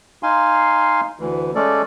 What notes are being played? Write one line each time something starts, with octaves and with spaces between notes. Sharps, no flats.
D#4 F5 G#5 C6
D2 E3
G#3 A3 C#4 A4 D5